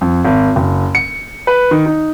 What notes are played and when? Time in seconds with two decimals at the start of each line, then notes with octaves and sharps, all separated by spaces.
0.01 F2
0.24 G#1
0.56 F#1
0.95 C#7
1.47 B4
1.71 D#3
1.86 D#4